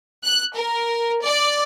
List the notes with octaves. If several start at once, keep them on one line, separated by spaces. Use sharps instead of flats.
F#6
A#4
D5